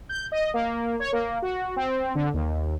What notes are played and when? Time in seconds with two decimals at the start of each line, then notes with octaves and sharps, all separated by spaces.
0.09 G6
0.32 D#5
0.54 A#3
1.00 C#5
1.12 A#3
1.42 F#4
1.76 C4
2.15 D3
2.34 D#2